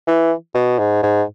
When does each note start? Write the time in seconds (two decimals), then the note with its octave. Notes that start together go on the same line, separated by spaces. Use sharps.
0.07 E3
0.55 B2
0.79 G#2
1.03 G#2